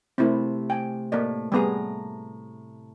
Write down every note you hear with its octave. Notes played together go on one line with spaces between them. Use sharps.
C3 A3 C4 E4 A#4
G5 G#5
A2 A#3 D5 D#5
A2 G3 B3 G#4 A#5